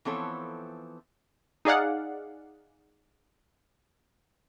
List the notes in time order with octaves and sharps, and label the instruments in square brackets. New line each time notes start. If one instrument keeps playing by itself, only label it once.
[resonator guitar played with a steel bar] E3 F3 B3 C4 A4 C#5
[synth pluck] D#4 G#4 D5 F5 F#5